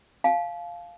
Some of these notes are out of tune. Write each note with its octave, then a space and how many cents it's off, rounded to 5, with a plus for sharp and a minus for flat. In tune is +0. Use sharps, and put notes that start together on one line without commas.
F5 +0 A5 -40